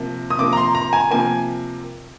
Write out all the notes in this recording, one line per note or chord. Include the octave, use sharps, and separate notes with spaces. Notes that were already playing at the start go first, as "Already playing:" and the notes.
Already playing: C3 F3 A#3
D#6
C3 F3 A#3 D6
A#5
C6
A#5
G#5
C3 F3 A#3 G#5